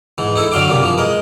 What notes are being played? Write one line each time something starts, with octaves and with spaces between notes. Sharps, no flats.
G#2 E3
D#4 E4 A4
D3 F#3 F5 G5 D6
A#1 C3 A#3
E3 F3
G#3 A#4